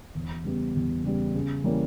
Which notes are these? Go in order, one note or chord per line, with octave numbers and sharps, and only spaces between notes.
E2
C#3 G3 B3 G4
E2
C#3 G3 B3 G4
C#3
E3 G3 A#3 C#4